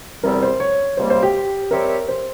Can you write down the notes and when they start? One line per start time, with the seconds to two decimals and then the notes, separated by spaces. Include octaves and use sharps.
0.23 E2 C3 G3 C4 A#4
0.43 C5
0.60 C#5
0.97 C#2 C3 G3 A#3 C5
1.10 C5
1.23 G4
1.71 G3 C4 G4 A#4 C#5 E5
2.08 C5